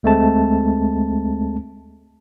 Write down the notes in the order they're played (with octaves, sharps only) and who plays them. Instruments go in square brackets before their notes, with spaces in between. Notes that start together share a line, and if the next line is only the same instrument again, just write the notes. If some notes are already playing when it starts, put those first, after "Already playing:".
[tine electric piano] D2 G#3 A3 C4 A5